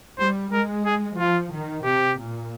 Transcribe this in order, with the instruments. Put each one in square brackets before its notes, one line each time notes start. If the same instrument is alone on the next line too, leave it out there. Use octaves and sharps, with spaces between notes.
[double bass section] G3 [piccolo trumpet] C5
[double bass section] G#3 [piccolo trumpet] A#4
[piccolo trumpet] G#4
[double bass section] F3 [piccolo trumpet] F4
[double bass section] D#3
[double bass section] C3 [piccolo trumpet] G4
[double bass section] A#2